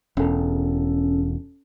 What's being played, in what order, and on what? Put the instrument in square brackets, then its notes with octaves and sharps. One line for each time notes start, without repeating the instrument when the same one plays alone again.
[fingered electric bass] E1 [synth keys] C#4 A4